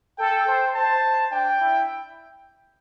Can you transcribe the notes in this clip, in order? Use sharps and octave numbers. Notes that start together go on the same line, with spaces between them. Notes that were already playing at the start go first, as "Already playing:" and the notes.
A4 G5
C5
C5 A5
D4 G5
E4